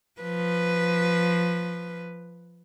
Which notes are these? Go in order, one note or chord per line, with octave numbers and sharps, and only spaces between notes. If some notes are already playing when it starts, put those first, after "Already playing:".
F3 B4